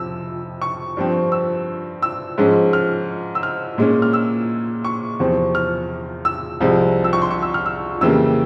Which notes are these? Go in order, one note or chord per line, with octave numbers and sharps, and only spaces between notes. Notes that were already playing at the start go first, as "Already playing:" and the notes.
Already playing: F2 C3 F3 E6
C#6
G2 F3 C4
E6
E6
G#2 F3 G#3 C#4
F6
E6
F6
A#2 G#3 C#4
F6
E6
C#6
E2 C3 F3 C4
F6
E6
C2 C3 F3 G#3
E6
C#6
C6
C#6
E6
F6
E6
F2 C#3 E3 G3 A#3 E6